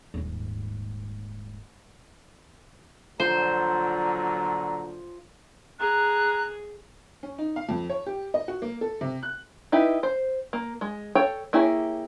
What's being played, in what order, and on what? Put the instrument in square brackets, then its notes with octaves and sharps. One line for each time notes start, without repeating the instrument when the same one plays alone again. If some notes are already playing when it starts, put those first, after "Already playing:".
[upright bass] D#1 G#2
[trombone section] A#2 D3 F#3 [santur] F3 [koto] C5 [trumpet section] A#5
[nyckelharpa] G#4 [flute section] A#5 F#6
[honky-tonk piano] C#4
D#4
F5
F2
C#5
G4
D#5
F#4
A#3
A4
C3
F#6
[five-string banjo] D#4 E4 G4 B4
C5
A#3
G#3
A4 C#5 G5
A#3 E4 G4 G#4 C#5